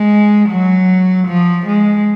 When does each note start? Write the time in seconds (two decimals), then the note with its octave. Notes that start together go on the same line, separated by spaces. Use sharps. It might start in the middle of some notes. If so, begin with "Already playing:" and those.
Already playing: G#3
0.50 F#3
1.27 F3
1.67 G#3